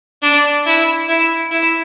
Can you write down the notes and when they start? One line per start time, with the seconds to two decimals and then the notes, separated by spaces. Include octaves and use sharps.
0.23 D4
0.66 E4
1.09 E4
1.51 E4